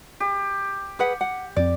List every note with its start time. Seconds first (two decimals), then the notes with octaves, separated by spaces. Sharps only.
0.20 G4
0.99 G#4 B4 F#5
1.21 F#5
1.56 F2 C4 D5